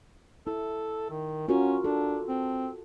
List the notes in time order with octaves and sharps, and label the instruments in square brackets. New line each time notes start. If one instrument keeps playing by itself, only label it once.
[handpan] E4 [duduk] A4
[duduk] D#3
[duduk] C#4 [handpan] F4 F#4 A#4
[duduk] D4 [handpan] A4
[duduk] C4